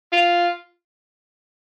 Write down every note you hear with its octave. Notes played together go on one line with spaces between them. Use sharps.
F4